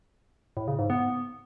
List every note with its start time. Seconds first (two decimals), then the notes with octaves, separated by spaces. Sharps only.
0.57 A2
0.68 C#3
0.79 G#2
0.90 B3